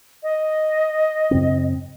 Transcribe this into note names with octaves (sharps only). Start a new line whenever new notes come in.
D#5
F#2 C#3 C4